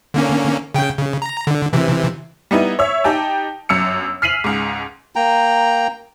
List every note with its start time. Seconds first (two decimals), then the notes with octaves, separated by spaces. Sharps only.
0.14 D3 A#3 C#4
0.74 C#3 G5
0.98 C#3
1.22 A#5
1.47 D3
1.73 C3 E3
2.51 G3 B3 D#4 E4
2.79 C#5 E5
3.04 D#4 G4 G5 A5
3.69 G1 F#2 E6 C#7
4.22 F6 B6 C7 D#7 F7 F#7
4.44 C#2 G#2
5.16 A#3 G5 A#5